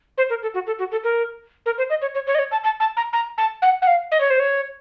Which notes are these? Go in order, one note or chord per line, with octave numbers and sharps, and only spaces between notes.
C5
A#4
A4
F#4
A4
F#4
A4
A#4
A#4
C5
D#5
C#5
C#5
C#5
D#5
C#5
A5
A5
A5
A#5
A#5
A5
F#5
F#5
F5
D#5
C#5
C5
C#5